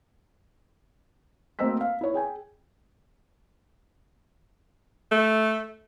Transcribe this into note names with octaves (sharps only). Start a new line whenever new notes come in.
D2 A#3 C4 D#5 E6 B6
F5
E4 C#5
G#4 G5 G#5
A3